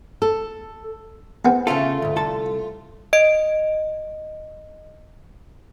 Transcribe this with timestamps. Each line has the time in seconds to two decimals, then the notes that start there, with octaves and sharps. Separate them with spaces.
0.22 A4
1.45 E2 B3 C4
1.67 C#3 A3 F4 A4
2.02 D2 G#2
2.16 C2 A4 A5
3.13 D#5 D7